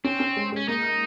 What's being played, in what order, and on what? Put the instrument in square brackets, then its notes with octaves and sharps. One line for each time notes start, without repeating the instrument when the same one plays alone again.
[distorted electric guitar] C4 [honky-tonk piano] C#4
[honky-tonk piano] C#4
G#3
[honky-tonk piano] G#3 [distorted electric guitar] C#4
[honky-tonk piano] A#3 [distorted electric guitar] D#4